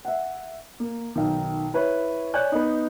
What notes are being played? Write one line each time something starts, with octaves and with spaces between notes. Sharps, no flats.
E5 F#5
A#3
B1 D#3
E4 B4 C#5
C#5 D5 G#5 F#6 G6
B3 D#4